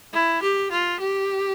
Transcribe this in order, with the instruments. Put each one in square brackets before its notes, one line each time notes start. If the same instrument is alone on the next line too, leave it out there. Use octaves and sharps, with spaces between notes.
[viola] E4
G4
F4
G4